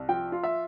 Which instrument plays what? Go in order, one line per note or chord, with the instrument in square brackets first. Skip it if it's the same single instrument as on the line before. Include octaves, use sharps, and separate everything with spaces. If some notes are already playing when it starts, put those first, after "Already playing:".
Already playing: [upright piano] C2
F3 G5
F4
E5